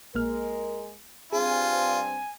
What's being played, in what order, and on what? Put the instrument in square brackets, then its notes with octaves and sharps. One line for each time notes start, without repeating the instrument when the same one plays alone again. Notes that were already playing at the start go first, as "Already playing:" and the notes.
[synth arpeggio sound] A#1 A#3 F6 [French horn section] G#3 A#4
[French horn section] G2 C4 [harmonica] F4 [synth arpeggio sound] G#4 [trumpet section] G#5